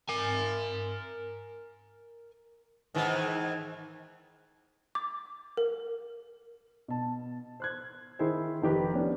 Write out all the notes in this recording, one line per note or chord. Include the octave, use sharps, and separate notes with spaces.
A#4 G#5
G#2 D#3 E3
D6
A#4
B2 A5
C5 F#6 G#6
D#3 E4 G#4 A#4 C5
F1 D#3 G4 B4
B3 C#4 D4